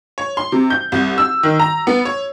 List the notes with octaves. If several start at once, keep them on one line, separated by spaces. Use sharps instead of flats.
C#5
C6
C3
G6
C2
E6
D#3
A#5
B3
C#5